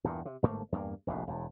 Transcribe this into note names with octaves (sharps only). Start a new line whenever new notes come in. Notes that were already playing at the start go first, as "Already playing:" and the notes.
E2 G2 A#2
C3
G1 G#2 A3 A#3
E2 G2 A3 A#3
F1 A#1 D#2 A2
E1 E2